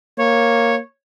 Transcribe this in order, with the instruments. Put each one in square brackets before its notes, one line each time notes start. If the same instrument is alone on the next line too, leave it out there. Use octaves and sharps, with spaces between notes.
[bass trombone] A#3 [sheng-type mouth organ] C#5